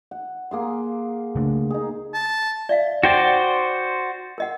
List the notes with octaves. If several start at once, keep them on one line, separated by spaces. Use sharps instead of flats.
F#5
A#3 G#4 C6
C#3 A3 D4
D#4 G#4
A5
D5 E5 F5
D#4 F#4 C5 D5 G5 A5
A#4 D#5 F#5